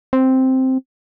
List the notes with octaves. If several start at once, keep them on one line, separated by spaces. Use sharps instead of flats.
C4